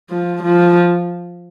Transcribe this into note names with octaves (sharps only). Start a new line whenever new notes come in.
F3
F3